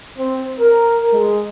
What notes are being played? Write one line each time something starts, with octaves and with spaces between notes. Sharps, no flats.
C4
A#4
G#3